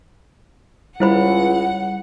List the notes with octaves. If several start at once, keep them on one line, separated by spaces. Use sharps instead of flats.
C#2 G3 E4 C5 F#5 B5